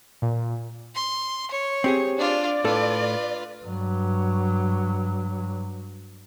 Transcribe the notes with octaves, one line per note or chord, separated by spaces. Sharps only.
A#2
C6
C#5
C4 G4 G#4
D4 F4 D5
A2 F4 A4 B4
G2 F#3